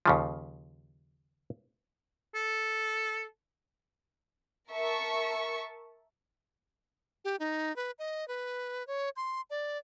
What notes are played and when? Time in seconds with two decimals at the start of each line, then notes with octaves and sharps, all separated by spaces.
0.06 D#2 C#3 F3
2.35 A4
4.71 A#4 E5 A5 C#6
7.25 G4
7.40 D#4
7.76 B4
7.99 D#5
8.28 B4
8.87 C#5
9.16 C6
9.50 D5